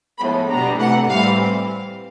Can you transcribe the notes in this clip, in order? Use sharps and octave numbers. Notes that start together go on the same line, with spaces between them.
A2 F3 G#3 B3 B5
B2 G3 B3 D4 A#5
C3 E3 A3 F#5
A2 E3 G3 C4 F5